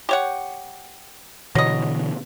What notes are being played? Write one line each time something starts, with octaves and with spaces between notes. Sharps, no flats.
G4 C#5 F#5
B2 D3 E3 F#3 D#5